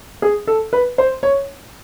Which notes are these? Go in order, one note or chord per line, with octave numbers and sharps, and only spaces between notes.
G#4
A4
B4
C5
C#5